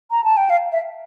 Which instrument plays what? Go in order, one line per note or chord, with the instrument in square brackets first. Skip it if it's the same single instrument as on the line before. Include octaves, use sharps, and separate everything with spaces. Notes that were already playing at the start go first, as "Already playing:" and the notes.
[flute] A#5
A5
G5
F5
E5